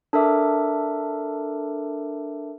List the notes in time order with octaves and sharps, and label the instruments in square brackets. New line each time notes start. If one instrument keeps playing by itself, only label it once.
[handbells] D4 A4 A#4 E5 D6